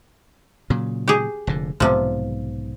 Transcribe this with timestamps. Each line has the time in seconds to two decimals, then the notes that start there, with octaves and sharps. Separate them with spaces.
0.70 A#2 C#3 F#3
1.08 G4 G#4
1.47 F1 A#2 D3
1.80 B1 G#2 C3 F3 B3